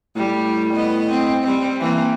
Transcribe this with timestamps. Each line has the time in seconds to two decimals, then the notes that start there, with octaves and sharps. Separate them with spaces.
0.16 A2 G3
0.74 B3 D#5
1.10 C4
1.43 G3 C4
1.80 E3 A#3 C4